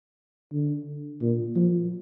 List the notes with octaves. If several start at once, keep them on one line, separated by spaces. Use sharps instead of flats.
D3
A#2
F3